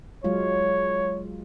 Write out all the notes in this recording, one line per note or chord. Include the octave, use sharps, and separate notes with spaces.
F#3 G#3 F4 C#5